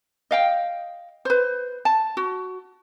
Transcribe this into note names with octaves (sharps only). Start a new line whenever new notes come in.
D#5 F5 G5
B4 C5
A5
F#4